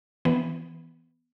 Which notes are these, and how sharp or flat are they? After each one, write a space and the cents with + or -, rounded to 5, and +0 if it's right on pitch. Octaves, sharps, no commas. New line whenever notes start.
E3 +0 B3 +0